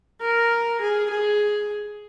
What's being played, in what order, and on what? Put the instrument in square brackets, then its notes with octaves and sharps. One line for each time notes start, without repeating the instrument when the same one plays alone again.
[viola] A#4
G#4
G#4